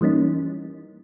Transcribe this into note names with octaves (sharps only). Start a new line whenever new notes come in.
E3 G3 A#3 C#4 D#4